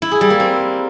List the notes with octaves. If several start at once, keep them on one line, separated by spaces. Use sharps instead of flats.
E4
G#4
G3
A#3
C4